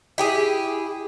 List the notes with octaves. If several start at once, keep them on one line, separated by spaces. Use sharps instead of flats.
E4 G4 G#4